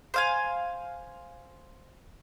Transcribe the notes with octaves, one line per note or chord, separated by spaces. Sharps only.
C5 F5 G#5